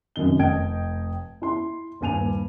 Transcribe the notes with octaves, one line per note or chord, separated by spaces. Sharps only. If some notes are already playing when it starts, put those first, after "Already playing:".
F#2 C3 D#3 G7
F1 D#5 G5 G#6 D7
E4 C6
D#1 G2 G#5 D#7 F7